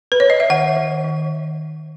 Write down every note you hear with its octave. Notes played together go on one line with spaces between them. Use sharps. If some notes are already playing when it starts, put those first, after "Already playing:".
B4
C#5
D#5
E5
D#3 F#5
D#3
D#3